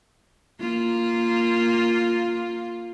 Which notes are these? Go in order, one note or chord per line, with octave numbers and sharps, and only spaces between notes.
A#3 F4